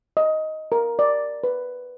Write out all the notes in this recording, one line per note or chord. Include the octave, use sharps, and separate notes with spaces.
D#5
A#4
D5
B4